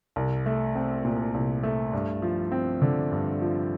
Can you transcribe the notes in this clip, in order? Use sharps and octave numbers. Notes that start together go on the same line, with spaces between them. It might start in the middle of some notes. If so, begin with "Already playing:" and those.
C2
A3
C4
A#2
C2
A3
G2
F3
C4
D3
G2
F3